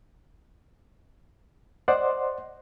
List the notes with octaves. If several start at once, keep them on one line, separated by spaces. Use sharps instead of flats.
C5 D5 D#5 F#5 C6